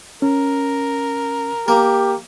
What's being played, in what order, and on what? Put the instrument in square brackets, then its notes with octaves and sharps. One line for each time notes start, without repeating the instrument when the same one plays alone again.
[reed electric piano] C#4 [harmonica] A#4
[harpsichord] A#3 [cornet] G4